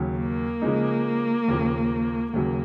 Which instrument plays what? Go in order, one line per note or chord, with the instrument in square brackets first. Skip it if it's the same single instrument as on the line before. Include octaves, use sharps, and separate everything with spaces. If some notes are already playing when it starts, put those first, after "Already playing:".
Already playing: [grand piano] D#2 C#3 F#3
[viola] A#3
[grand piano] C#3 F3 G#3 D#4
D#2 C#3 F3
[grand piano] D#2 C#3 F#3 [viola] A#3